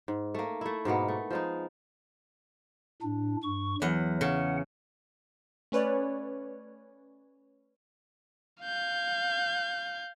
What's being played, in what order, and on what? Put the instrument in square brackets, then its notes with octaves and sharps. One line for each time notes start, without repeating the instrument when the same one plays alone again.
[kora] G#2
A3 A#3
A3 E4
G#2 B2 A#3 B3
A3
F3 G#3 D#4
[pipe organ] A2 D4
G2 C#6
[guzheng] E2 F#5 [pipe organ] F#3
[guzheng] C#3 [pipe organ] F#5
[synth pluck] A3 C#4 B4 C#5 D5
[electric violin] F5 G6